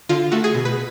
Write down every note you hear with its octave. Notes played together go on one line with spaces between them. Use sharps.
D3 F4
A3 F#4
G#4
B2
B4